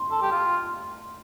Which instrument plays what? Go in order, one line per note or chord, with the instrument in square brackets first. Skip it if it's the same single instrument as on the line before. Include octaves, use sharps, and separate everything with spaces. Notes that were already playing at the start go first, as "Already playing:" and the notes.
Already playing: [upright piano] C6
[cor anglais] A4
G4
F4